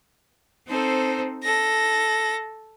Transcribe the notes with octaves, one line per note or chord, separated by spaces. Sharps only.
C4 D#4 A4 C5
A4 A#6